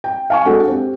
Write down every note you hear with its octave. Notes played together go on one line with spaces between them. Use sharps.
G5
F5 G#5 C#6
G#3 D4 F#4 A4 F#5
C4 G4